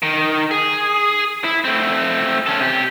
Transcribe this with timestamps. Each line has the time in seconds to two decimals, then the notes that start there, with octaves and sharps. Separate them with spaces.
0.03 D#3
0.51 G#4
1.44 E4
1.64 A3 C4
2.47 C#4 A4
2.60 C3 G4